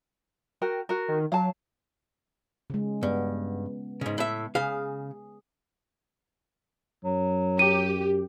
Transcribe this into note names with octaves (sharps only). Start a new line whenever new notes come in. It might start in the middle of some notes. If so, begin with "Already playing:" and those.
F#4 A#4 G5
F#4 A#4
D#3
F#3 F5 A5
C#3 G#3
G2 B3
G#2 C#3
A2 E5
C#3 G#4 F5
F#2 F#3
G4 D#7